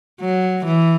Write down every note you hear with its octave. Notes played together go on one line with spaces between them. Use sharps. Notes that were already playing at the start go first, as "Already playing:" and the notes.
F#3
E3